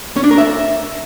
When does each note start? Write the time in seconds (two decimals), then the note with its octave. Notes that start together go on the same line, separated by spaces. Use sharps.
0.16 C#4
0.24 D4
0.31 A#4
0.38 E5